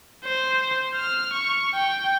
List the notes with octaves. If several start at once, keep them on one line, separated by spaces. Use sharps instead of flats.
C5
F6
C#6
G5